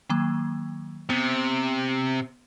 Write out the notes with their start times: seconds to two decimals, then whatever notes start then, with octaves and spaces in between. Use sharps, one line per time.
0.10 D#3 F#3 A#3
1.10 C3 B3